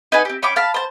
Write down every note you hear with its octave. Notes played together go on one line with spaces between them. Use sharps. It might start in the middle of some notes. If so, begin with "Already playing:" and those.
D#4 B4 F#5 G#5
C4 G4
C#4 G5 B5 D6
F5 A5 B5
C5 A5